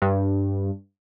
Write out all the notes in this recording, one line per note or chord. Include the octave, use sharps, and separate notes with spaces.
G2